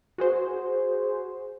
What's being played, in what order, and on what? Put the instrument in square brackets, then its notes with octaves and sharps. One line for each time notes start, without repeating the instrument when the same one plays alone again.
[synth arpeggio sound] F#4 G#4 C5